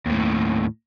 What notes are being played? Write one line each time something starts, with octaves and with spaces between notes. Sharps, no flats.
D#2 A2